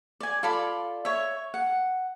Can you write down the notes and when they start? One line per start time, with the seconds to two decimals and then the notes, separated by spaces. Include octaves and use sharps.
0.20 D5 G#5
0.43 F4 A4 D5 B5
1.05 C#5 E5
1.54 F#5